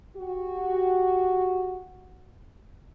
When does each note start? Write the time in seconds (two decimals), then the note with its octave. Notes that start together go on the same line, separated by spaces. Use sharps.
0.16 F#4 G4